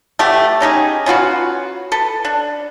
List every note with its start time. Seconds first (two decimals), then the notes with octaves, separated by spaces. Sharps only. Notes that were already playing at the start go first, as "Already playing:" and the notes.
0.19 A3 B3 G4
0.60 C#4 D#4 G4 G#4
1.06 C#4 F4 F#4 B4
1.92 A4 B4
2.25 D4